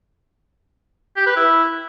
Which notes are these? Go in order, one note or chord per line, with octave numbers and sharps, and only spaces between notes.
G4
B4
E4